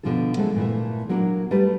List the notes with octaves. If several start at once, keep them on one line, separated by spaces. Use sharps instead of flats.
B2 D3 D#3 F3 F4 A4
F#3 G#3 A3 C4 A4
A#2 E3 A3
F#3 A#3 D4 F#4
G3 A3 B4